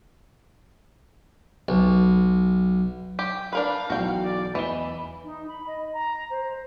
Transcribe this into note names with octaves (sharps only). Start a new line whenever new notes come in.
B1
G4
D4 A#4 B4 F5
B1 E3 F#3 F#4 G5
D5
E2 E3 D#5 B5 G7
D#4
B5
D#5
A#5
C5